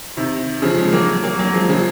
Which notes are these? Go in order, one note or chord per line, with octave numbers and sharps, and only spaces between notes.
C3 D#3
C#3 F3
F3 G#3
F#3 A#3
F#3 A#3
F#3 A#3
F3 G#3
C#3 F3